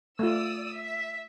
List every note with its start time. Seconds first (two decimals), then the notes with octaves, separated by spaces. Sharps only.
0.19 A3 F4 D5 D#6 E6
0.73 E5